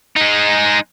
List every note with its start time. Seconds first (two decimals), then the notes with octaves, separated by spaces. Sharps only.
0.16 G#3 D#4